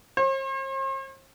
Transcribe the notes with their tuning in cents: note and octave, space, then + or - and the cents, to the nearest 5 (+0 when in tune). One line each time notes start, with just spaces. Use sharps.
C5 +45